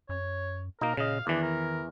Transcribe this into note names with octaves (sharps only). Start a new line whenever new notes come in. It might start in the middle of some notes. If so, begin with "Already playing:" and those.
F#2 C#5
B2 A#3 D#4 A#4
A#2 C#3 D#5 F5
E2 D#3 E3 D4
A#4